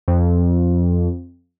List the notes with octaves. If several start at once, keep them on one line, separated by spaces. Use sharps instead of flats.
F2